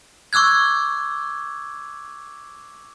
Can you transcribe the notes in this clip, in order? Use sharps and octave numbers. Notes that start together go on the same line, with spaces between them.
C#6 D6 E6 F#6 G#6